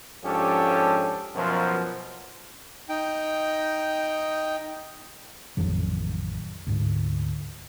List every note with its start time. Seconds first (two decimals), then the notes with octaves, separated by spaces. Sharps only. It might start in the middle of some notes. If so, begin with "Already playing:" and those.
0.24 G#2 F3 C#4 D4 G4 A4
1.36 F#2 B2 F3 F4 A#4 C5
2.89 D#4 G5
5.57 A1 F2 D#3 F#3
6.67 D2 G#2